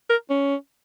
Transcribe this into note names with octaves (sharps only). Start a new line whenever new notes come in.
A#4
C#4